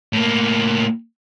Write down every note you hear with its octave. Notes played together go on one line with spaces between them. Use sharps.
A2 A#3